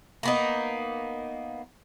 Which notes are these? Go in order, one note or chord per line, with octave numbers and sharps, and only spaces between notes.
A#3 B3 D#4